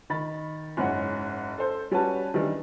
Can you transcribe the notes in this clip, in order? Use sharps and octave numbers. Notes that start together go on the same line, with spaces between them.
D#3 B5 A6
F#1 G#2 C#4 F#5
A4 C5
G3 C#4 F#4 B4 A5
D#3 E3 G3 D4